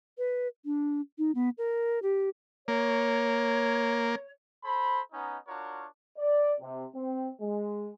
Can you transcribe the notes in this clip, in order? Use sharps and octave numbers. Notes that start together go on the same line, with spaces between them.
B4
D4
D#4
B3
A#4
G4
A#3 C#5
A4 C5 B5
B3 C#4 D#4
D4 F4 F#4 A#4 C#5
D5
C3
C4
G#3